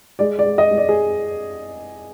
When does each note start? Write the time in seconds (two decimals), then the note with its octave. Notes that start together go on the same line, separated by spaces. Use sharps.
0.19 G#3 D5
0.39 D5
0.45 G#3
0.58 D#5
0.71 G#3
0.78 D5
0.89 G#4